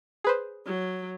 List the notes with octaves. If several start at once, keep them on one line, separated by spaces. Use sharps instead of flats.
G#4 B4 C5
F#3